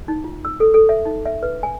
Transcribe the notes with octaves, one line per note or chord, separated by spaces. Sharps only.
D#4
F4
E6
A4
A4
E5
D#4
E5
B4
G#5